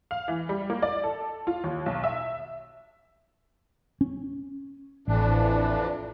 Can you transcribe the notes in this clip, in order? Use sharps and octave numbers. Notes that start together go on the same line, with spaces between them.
F5
E3
G3
A#3
D5
A4
F4
D#2
B1
E5
C#4
A1 F2 E3 D4